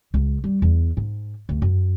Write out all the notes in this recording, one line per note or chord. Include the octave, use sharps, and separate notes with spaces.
C#2
G3
E2
G#2
D2
F#2